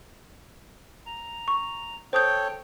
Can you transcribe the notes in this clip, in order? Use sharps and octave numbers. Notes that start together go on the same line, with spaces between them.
A#5
C#6
A4 C5 C#5 G5 D#6 G6